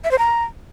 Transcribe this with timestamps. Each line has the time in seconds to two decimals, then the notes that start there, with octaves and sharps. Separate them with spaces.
0.04 E5
0.11 C5
0.19 A#5